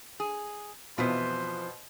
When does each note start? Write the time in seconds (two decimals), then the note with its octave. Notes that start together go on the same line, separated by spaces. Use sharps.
0.20 G#4
0.98 F2 B2 E3 F3 B3 C5 B6